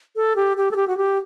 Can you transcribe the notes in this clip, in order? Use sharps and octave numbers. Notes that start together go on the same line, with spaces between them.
A4
G4
G4
A4
G4
F#4
G4